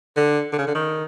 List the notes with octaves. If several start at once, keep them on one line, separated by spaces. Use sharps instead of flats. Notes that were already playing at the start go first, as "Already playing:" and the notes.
D3
D3
C#3
D3
D#3